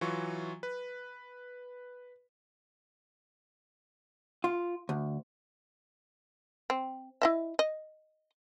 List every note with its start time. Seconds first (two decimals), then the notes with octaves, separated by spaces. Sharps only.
0.01 E3 F#3 F4 C#6
0.63 B4
4.44 F4
4.89 D2
6.70 C4
7.22 E4 D#5 E5
7.59 D#5